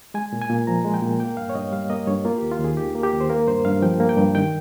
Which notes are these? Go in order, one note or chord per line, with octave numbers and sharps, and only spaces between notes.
G#3 G#5
A#2
G#5
A#2
F3 A#5
G#3
G5
A#2
A#3 G5
G2 F5
C#5
G2 D#5
G3 F5
A#3 D#5
G2 C#5
A#3 F4
D#2 G4
F4
D#2
G#4
D#3 G4
A#3
G4
D#2
C5
A#3 A#4
G2 C5
G2 F5
F3 G5
A#3
G5
G2
D#3 G5